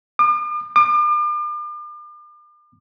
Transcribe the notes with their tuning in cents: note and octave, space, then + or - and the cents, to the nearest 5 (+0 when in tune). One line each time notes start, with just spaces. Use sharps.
D6 +45
D6 +40